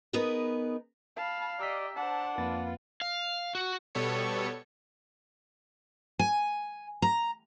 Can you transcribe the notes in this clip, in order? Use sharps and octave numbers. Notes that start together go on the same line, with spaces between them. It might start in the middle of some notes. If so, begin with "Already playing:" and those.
B3 D#4 G#4 A#4 B4
F5 A5 B5
G4 D5 D#5 A#5 E6 B6
D4 C5 F#5 A5
F2 A#3 F4 B4 A6
F5
F#4
B2 G3 B3 A4 C#5 C#7
G#5
A#5